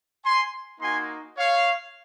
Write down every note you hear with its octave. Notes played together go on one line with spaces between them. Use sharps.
G#5 C6
A#3 D#4 F#4 G#5 C6
C#5 F5